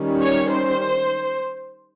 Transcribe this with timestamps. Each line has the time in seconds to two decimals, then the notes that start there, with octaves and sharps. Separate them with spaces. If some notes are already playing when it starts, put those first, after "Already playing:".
Already playing: D#3 G3 C#4
0.21 C#5
0.50 C5